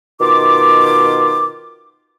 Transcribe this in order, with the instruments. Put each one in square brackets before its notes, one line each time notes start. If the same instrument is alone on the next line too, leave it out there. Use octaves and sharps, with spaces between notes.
[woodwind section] B2 D#3 F4 D6